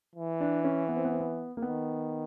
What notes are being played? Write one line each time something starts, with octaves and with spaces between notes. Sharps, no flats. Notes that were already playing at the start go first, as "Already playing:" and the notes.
E3
D4
C#4
B3
C4
B3
C4
B3
A#3
D#3 B3